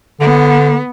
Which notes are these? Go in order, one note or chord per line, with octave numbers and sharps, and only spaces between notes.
D3 B3